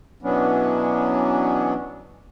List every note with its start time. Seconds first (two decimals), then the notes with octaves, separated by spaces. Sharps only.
0.23 B2 E3 F#3 B3 C#4 D4